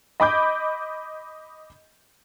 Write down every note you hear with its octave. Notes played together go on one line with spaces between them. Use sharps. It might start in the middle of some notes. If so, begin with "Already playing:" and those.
D#5 B5 D6 G6